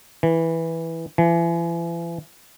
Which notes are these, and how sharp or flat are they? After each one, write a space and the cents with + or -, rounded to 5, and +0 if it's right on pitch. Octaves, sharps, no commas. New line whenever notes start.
E3 -5
E3 +40